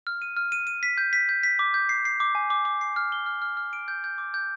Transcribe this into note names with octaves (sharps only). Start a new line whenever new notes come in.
F6
D#7
F6
D#7
D#7
B6
G6
B6
G6
B6
D6
G6
C7
C7
D6
G#5
D6
D6
C7
F6
G7
F6
F6
F6
D7
G6
G6
D6
G6